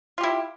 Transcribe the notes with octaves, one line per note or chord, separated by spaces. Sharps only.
E4 F4 G4